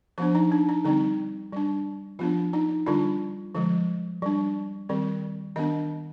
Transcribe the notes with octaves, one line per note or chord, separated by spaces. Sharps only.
F3 B3 D4 C5
D#4
D4
D#4
D3 G3 C4 D#4
G3 D4
F3 B3 D4 F4
D#4
D3 G3 D4 F4
D3 F3 G#3
G3 D4
D#3 G3 C4
D#3 B3 D4 D#5